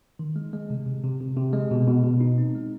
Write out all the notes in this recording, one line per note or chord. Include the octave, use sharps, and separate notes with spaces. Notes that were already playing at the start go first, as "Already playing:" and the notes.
D#3
G#3
G#3
C3
C3
C3
C3
C3
G#3
B2
B2
B2
D#4
C4
G#3